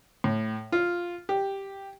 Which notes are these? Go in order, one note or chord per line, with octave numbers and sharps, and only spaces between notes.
A2
F4
G4